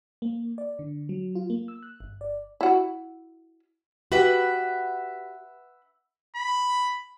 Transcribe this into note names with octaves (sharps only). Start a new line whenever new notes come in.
A#3
D5
D3
F#3
F4
A#3
E6
F#6
G1
D5
E4 F#4
F#4 G4 B4 E5 F#5
B5